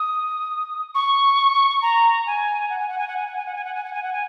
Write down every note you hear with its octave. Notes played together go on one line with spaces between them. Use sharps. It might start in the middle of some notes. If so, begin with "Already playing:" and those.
Already playing: D#6
C#6
A#5
G#5
F#5
G#5
F#5
G#5
F#5
G#5
F#5
G#5
F#5
G#5
F#5
G#5
F#5
G#5
F#5
G#5